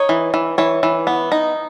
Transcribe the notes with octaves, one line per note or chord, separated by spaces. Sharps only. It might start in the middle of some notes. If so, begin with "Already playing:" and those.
Already playing: D#4 C#5
E3
E3
E3 C#5
E3
B3
D#4